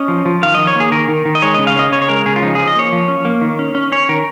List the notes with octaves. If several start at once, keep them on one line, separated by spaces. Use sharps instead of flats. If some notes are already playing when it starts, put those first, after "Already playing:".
Already playing: C#4 D#5
F3
F3
D#3 F5
D#3 D#5
C#5
A#3 G#4
D#3 A#4
D#3
D#3
D#5
G#3 C#5
C#3 D#5
F5
C#4 D#5
C#3 C#5
C#5
G#3 A#4
C#3 G#4
F4
F3 D#4
F3 G#4
D#5
A#3 C#5
F3
C#4
A#3
D#3
C#4
C#4
C#4 C#5
D#3 A#4